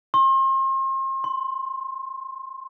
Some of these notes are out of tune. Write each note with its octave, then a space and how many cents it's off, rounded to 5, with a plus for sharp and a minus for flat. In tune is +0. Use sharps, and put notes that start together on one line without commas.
C6 +40
C6 -5